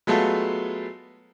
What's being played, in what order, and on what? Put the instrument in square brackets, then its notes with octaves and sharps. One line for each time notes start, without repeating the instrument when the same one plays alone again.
[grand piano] F#3 G#3 A3 B3 F4 A4